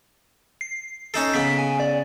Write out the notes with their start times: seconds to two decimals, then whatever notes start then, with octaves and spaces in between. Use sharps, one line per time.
0.61 C7
1.14 C#4 D#4 A4 C7
1.34 C#3 B3 B6
1.58 G#5
1.80 D5